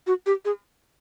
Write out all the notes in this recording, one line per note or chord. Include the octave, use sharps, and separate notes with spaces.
F#4
G4
G#4